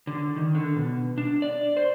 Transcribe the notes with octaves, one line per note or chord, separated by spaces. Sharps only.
D3
D#3
D3
B2
D4
D5
C5